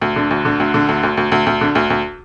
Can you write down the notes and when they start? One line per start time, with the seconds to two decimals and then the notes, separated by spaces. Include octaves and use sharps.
0.01 D2
0.16 D3
0.31 D2
0.45 D3
0.60 D2
0.74 D3
0.89 D2
1.03 D2
1.17 D2
1.32 D2
1.46 D2
1.61 D3
1.75 D2
1.90 D2